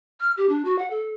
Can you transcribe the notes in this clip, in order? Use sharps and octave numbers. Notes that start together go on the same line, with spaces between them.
F6
G4
D4
F#4
F#5
A4